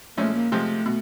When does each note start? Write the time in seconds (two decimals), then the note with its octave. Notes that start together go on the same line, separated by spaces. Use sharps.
0.17 A#2 F3 G#3 A3 C#4 E4
0.34 A#3
0.52 C3 F3 G#3 A3
0.86 B2